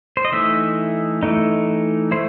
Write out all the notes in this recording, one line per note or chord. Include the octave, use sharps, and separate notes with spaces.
C5
D#5
E3 A3 D#4 E5
E3 A3 D#4
A3 E4 C5